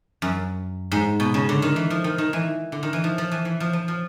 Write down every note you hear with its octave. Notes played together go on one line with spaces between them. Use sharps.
F#2
G#2
B2
C#3
D3
D#3
E3
F3
D#3
D#3
E3
D3
D#3
E3
F3
F3
E3
E3
F3
F3
F3